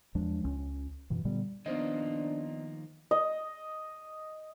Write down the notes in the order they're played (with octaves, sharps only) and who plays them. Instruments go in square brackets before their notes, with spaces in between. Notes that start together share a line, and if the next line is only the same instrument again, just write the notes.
[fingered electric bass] E2 F3 G#3 D4
C#2 C#4
F#2 B2 E3
A#2 D3 G3 B3
[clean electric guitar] D#3 F3 A#3 [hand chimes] B3 C5 D#5 [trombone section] D4
[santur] D#5